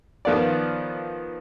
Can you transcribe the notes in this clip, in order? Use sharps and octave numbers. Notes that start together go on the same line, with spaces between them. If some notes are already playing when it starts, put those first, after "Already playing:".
D#3 F3 B3 F4 D5